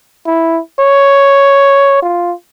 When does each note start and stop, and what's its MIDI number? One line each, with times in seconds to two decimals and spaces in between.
0.26 0.59 64
0.80 2.00 73
2.02 2.33 65